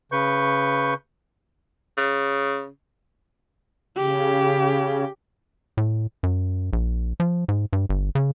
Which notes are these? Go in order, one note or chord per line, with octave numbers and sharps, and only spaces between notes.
C#3 B4 C#6 G6
C#3
C#3 G4
A2
F#2
A#1
F3
G#2
G2
G1
C#3